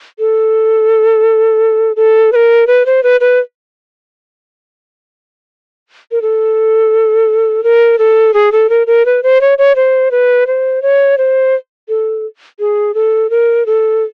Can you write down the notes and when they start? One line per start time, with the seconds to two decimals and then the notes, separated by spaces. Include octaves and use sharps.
0.19 A4
1.96 A4
2.32 B4
2.36 A#4
2.67 B4
2.86 C5
3.03 B4
3.21 B4
6.11 A#4
6.22 A4
7.63 A#4
7.99 A4
8.34 G#4
8.52 A4
8.70 A#4
8.87 A#4
9.06 B4
9.23 C5
9.41 C#5
9.58 C#5
9.76 C5
10.11 B4
10.47 C5
10.82 C#5
11.18 C5
11.89 A4
12.59 G#4
12.94 A4
13.30 A#4
13.66 A4